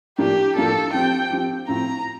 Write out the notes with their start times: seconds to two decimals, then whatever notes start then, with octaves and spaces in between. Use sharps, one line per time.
0.18 A2 F3 A#3 D4 G4
0.56 A2 F3 A#3 D4 A4
0.94 F3 C4 G4 G5
1.31 F3 C4 G4
1.68 A2 F3 C4 A#5